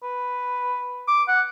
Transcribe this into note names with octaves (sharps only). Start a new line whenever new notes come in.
B4
D6
F#5